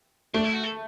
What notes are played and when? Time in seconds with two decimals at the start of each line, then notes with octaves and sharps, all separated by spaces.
0.34 A3 D4
0.44 E4
0.53 F#4
0.64 A4